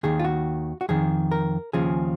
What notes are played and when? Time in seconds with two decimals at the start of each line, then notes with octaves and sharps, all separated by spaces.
0.03 D#2 D#3 G#4
0.19 F4
0.24 F#4
0.81 F#4
0.89 F2 D#3 G#4
1.31 A#4
1.73 D#2 C#3 F3 G#4